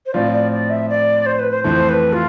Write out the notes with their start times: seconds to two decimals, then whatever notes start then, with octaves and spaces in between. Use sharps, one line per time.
0.06 C5
0.14 A2 F3 C4 F4 D5
0.32 D5
0.51 D5
0.70 E5
0.89 D5
1.26 C5
1.39 B4
1.51 C5
1.64 F2 E3 A3 C5
1.89 B4
2.13 F4